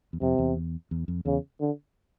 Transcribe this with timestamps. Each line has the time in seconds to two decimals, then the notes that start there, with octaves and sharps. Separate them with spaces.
0.13 E2
0.21 F2 C3
0.39 E2
0.91 E2
1.08 F2
1.25 E2 C#3
1.60 D3